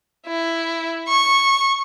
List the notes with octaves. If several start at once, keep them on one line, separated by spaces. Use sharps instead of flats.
E4
C#6